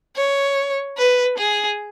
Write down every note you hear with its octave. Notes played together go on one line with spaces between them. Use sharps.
C#5
B4
G#4